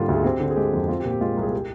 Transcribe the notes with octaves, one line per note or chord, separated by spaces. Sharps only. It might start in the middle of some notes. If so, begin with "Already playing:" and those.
Already playing: G#2 D3 G3 A#3 F4
D2
G#4
C4 G4
D3
G#4
G#3 G4
F2
C4 F4
G4
A#2
G4
G#3 F4
C2 G#4
G4